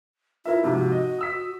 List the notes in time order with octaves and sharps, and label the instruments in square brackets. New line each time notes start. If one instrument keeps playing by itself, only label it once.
[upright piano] E4 A#4 E5 [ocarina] F4
[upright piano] G#2 C3 F3 [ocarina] F#4
[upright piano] D#5
D#6 E6 B6